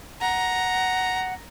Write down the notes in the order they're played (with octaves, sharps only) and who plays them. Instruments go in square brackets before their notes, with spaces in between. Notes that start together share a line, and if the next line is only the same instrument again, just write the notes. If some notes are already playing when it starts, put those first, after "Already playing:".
[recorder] F#5 [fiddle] A#5